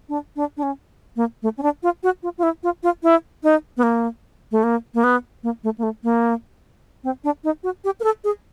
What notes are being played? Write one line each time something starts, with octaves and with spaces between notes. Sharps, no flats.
D4
D4
D4
C#4
A#3
A3
C#4
D4
F4
F#4
F4
F4
E4
F4
F4
E4
D#4
B3
A#3
A3
A#3
A#3
B3
A#3
A3
A#3
A3
A#3
C4
D4
D#4
F#4
G4
A#4
A4
G#4